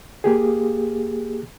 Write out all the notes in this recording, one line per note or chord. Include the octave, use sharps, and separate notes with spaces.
A#3 G4 G#4